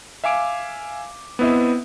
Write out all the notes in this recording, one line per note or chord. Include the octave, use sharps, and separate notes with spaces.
E5 F5 G#5 D6 D7
B3 C4 E4 D#5 E5